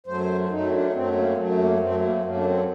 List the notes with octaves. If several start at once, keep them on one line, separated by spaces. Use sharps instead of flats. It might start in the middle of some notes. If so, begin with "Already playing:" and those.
F#2 F#3 A3 C5
F#2 F#3 A3 D#4
C4
D4
F#2 F#3 A3 C4
A#3
F#2 F#3 A3
A#3
F#2 F#3 A3 C4
A#3
F#2 F#3 A3 A#3
D4
C4